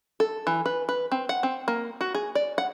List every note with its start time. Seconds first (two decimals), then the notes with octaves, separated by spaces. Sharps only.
0.20 A4
0.47 E3
0.66 B4
0.89 B4
1.12 C4
1.29 F#5
1.43 C4
1.68 A#3
2.01 F#4
2.15 G#4
2.35 D5
2.58 F#5